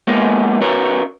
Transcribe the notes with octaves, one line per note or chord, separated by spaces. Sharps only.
G#3 A#3 B3 C#4 F4 A#4
C#4 F#4 A#4 B4 C#5